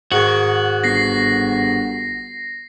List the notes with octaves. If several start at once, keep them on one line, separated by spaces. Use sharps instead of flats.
G#2 D#3 F#4
G1 A#6 C7